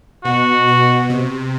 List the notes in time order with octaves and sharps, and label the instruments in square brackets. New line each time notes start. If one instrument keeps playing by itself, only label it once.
[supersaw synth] B2 [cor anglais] F#4
[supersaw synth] B2
C3